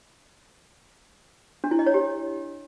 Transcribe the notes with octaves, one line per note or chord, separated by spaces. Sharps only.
D4
E4
D#5
C#5
G4